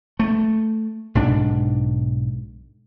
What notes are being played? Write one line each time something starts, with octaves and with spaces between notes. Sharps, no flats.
A3
B1 G#2 D4